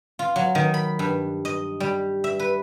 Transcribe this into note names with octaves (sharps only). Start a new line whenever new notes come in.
F4
F#3
D#3
B5
G2
D#5
G3
E5
B4